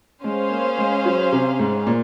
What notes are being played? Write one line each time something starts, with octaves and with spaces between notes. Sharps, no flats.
G#3 C#4 G#4 C5 F5
A#3
G#3
F#3
C3
G#2
A#2